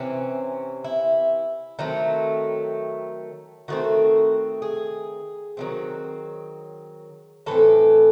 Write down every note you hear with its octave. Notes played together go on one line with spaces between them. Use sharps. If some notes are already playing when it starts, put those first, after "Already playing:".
Already playing: C3 E3 C4 C#4
E4
D#3 F#3 A3 C4
D#3 A3 C4 F#4
G#4
D#3 F#3 A3 C4
A2 E3 C4 A4